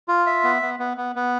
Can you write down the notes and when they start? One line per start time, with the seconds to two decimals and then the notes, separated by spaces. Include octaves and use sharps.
0.08 F4
0.26 E5
0.44 B3
0.62 B3
0.79 B3
0.97 B3
1.16 B3